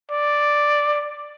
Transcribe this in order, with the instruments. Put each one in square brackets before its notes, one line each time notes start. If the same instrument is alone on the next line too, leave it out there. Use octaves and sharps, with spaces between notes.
[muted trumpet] D5